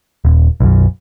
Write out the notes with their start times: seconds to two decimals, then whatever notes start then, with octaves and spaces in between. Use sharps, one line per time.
0.25 D#1
0.60 B1 F#2